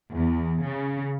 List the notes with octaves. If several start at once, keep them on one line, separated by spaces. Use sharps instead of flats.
E2
C#3